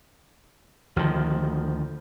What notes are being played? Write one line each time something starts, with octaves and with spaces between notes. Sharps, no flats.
D2 D#3 F3